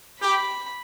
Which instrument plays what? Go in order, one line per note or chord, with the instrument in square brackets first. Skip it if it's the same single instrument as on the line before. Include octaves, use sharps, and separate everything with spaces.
[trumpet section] G4 [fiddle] B5